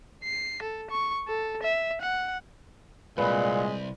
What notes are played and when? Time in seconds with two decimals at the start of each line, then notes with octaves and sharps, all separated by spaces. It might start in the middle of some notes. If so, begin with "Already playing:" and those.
0.24 C7
0.63 A4
0.91 C#6
1.28 A4
1.63 E5
2.01 F#5
3.18 C2 F2 A#2 G#3 B4